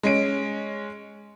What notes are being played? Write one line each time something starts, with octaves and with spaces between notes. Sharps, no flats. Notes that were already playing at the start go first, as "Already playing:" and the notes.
G#3 C#4 D7